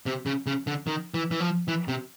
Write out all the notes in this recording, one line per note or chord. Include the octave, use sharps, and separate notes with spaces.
C3
C#3
C#3
D3
D#3
E3
E3
F3
E3
C3